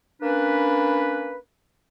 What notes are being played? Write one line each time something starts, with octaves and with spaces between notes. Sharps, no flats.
A#3 C#4 D4 B4